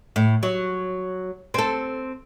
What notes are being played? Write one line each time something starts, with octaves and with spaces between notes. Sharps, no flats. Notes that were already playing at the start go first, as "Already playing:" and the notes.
A2
F#3
C4 A4